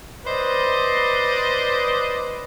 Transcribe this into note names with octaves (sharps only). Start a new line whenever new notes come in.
B4 C5 D5 D#5